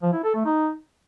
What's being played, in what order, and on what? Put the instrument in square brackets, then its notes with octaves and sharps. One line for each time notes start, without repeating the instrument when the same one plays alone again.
[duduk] F3
E4
A4
A3
D#4